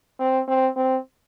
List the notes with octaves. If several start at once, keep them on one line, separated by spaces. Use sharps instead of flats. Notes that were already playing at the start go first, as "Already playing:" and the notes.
C4
C4
C4